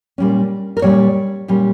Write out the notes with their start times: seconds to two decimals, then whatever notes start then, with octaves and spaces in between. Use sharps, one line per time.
0.18 A#2 G3 C#4
0.77 A#4
0.82 A#2 G3 C#4 C#5
1.48 A#2 G3 C#4